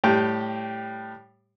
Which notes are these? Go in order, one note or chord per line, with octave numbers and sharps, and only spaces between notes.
A2 G3 G4 G5